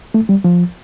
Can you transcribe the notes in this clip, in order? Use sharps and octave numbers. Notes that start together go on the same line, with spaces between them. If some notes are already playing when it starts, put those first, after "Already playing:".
A3
G3
F3